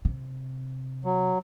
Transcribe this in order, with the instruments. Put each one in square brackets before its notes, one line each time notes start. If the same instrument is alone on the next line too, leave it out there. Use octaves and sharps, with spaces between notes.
[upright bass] C3
[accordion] F#3